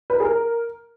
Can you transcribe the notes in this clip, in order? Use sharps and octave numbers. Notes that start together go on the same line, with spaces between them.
B4
A#4
G#4
A#4